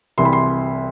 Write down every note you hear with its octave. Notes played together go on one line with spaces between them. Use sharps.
C2 C3 E3 C6
B5
C6